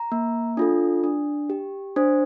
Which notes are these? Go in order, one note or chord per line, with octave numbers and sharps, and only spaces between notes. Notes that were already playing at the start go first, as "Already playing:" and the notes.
Already playing: A#5
A#3
D4 F4 A4
D4
G4
D4 C5